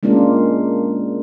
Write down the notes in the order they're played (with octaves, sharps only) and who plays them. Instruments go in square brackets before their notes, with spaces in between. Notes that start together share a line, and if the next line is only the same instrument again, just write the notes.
[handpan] G#3 A#3 C#4 D4 F4